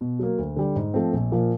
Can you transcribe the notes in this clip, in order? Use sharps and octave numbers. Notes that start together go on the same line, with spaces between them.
B2
F#3 A#3
D2
D3 G3
G#2
F3 A3 C4
A#1
A#2 F3 A#3